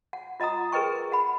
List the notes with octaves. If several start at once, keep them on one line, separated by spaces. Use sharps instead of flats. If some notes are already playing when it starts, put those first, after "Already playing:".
F#5
F4 D#5 F#5 A#5 D#6
G#4 A#4 B4 D#5 G5 C#6
F#5 B5